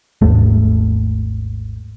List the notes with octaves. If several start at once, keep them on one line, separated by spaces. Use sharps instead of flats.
G#1 D#2 A3